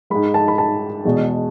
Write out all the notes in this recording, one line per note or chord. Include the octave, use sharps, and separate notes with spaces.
G#2 G#3 B5
A5
B5
A5
E2 B2 G#3